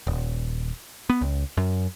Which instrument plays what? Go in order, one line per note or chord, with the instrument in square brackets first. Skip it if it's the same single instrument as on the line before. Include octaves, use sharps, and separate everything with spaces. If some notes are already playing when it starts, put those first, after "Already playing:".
[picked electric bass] D#1
B3
C#2
F#2